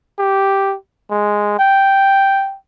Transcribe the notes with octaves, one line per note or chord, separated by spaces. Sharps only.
G4
G#3
G5